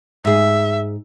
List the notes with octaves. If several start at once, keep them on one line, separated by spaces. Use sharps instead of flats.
G#2 G#4 E5